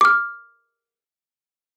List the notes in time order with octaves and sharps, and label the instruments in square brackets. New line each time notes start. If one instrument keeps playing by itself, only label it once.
[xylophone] D6 F6